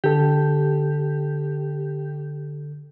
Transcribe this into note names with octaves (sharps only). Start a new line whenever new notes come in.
D3 G4 A4